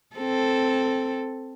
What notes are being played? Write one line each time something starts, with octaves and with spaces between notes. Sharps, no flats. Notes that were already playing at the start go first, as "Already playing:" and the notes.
C4 A4